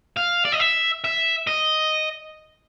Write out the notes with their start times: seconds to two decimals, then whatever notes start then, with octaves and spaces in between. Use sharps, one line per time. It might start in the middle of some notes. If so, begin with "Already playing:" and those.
0.17 F5
0.45 D5
0.52 D#5
0.60 E5
1.04 E5
1.47 D#5